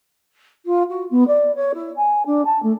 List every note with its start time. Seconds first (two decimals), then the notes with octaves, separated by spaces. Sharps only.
0.66 F4
0.90 F#4
1.11 B3
1.27 D5
1.55 C#5
1.74 E4
1.97 G#5
2.26 D4
2.45 A5
2.63 A3